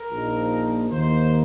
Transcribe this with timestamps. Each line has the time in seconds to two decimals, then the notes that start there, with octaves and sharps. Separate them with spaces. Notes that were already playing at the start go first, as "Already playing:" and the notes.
Already playing: A#4
0.10 A#1 A#2 F3 D#4
0.91 D#2 D#3 A#3 D#4 C5